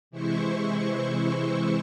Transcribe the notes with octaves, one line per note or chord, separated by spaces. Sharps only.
C3 E3 G#3 E4 C5 C#6